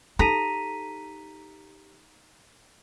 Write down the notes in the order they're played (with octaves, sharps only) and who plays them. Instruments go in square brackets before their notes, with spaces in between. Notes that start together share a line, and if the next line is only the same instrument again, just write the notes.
[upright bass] D#4 [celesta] G4 B6 D#7 [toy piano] A4 A5 [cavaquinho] A#5